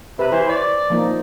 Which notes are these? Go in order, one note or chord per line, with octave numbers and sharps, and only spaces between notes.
C3 B4
E3 C5
C#5 D5
F3 A#3 D#4